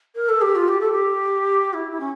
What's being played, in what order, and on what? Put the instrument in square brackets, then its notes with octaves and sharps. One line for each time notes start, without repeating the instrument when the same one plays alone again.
[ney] A#4
A4
G4
F4
G4
A4
G4
E4
E4
C#4